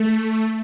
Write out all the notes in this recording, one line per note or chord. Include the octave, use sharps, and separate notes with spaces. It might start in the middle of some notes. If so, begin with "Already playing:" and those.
Already playing: A3